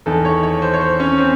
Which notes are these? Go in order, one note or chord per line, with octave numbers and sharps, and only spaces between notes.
E2 D#3 A4
C#5
C#5
C5
C#5
C5
C#4
C4